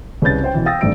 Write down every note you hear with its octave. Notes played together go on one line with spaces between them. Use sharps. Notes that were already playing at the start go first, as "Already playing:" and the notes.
C2 C#3 B4 C#5 G6 A6
C#4 C5 G5
B2 E3
F5 G5 D#6 E6 A6 A#6
G#1 G2 A3 D5 E6 D7